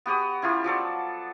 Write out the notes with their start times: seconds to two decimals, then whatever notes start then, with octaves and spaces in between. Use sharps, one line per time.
0.06 B3 F#4 G4 D#6
0.42 C#4 E4 F4 G4
0.64 F3 F#3 A4 D5